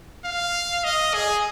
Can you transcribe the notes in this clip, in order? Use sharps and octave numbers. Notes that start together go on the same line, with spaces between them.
F5
D#5
G#4